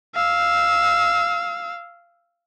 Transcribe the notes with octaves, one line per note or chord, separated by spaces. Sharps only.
F5 E6